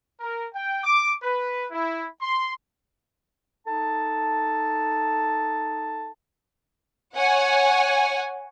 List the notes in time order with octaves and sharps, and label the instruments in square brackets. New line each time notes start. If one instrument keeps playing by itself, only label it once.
[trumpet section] A#4
G5
D6
B4
E4
C6
[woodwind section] D#4 A4 A5
[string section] C#5 F#5 G#5